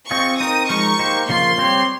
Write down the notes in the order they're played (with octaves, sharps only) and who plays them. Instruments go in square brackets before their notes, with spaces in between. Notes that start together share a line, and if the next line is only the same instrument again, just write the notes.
[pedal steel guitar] C4 F4 G#4 D#5 [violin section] C#6
[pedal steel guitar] C4 D#4 A#4 [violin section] D#6
[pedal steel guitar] F3 G#3 D#4 A#4 [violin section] C#6
[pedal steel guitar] A#3 D#4 G4 C5
[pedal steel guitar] C#3 F3 A#3 F4 [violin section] C6
[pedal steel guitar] G3 C4 G4 C#5